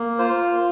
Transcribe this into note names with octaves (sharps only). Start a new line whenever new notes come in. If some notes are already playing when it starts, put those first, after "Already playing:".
Already playing: A#3
F4 C5